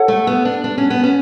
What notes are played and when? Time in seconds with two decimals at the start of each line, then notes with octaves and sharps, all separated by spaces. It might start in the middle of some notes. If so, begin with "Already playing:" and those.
Already playing: A4 C#5 F#5
0.08 A3
0.27 B3
0.45 D4
0.64 D4
0.78 C#4
0.90 B3
1.03 C#4